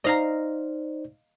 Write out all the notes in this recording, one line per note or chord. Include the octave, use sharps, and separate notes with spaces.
D#4 C5 D5 D#5 F5 A#5